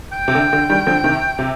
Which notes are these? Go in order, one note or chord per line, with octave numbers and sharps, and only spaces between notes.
G5
C3
D3
D3
D#3 G3
D3 F3
C3 D#3
C3